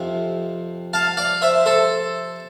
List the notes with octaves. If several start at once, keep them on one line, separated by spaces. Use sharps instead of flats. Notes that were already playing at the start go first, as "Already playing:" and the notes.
Already playing: F2 C3 F3
F5 A5
D5 F5
C5 E5
A4 C5